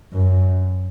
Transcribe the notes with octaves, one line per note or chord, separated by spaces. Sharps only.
F#2